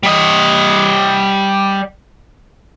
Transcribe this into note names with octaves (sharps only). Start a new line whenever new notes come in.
G3 D#5